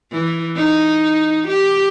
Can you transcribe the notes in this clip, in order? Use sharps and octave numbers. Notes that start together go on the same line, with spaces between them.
E3
D#4
G4